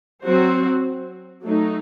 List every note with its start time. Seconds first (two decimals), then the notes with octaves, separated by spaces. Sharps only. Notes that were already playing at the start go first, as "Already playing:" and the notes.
0.25 F#3 C4 F#4 C5
1.44 F#3 A3 D#4